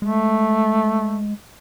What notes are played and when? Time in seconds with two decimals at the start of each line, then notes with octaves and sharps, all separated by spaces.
0.02 G#3 A3